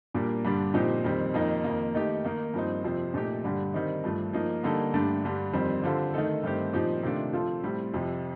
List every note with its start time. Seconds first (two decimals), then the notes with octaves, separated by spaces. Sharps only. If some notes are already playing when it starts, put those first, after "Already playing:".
0.14 A#2 G3 A#3 D4
0.45 G2 D3 G3 D4
0.74 A#2 F3 C4 D#4 G4
1.04 F2 D#3 G3 C4
1.34 F2 D#3 A#3 D#4
1.64 F2 D#3 A#3
1.94 D#3 A3 D#4 G4
2.24 D#3 A#3 D#4
2.54 G2 F3 C4 D#4
2.84 F2 C3 F3 C4
3.14 A#2 A3 D#4 G4
3.44 G2 D3 G3
3.74 D#3 G3 C4 D#4
4.04 G2 F3 A3
4.33 F3 A#3 D#4
4.63 D3 G3 A#3 D#4 A4
4.94 G2 D3 A3 D4 G4
5.24 G2 D3 G3 D4
5.53 F2 D#3 G3 C4
5.83 D3 G3 C4 F4 A4
6.14 D#3 A3 D#4 A4
6.44 G2 D#3 A3 C4 G4
6.73 A#2 F3 C4 D#4 G4
7.03 C3 D#3 A3 D4 F4
7.33 F3 C4 F4 A4
7.63 A2 G3 C4
7.94 F2 C3 F3